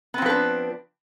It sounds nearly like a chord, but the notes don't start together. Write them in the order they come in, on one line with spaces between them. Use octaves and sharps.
B3 C4 F3 B4 D4